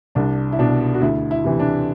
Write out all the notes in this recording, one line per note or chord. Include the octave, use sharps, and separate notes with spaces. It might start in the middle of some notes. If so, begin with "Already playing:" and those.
C2 D4
E4
B2 D4
F#4
D2 E4
E4
C3 E3
D4